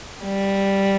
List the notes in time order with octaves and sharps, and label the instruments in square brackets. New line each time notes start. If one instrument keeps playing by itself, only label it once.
[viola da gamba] G3